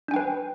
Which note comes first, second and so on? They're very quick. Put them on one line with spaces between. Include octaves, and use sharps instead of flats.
D4 G#5 G5 B4